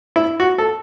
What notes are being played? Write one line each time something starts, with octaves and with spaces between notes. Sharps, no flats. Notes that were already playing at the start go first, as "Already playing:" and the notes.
E4
F#4
A4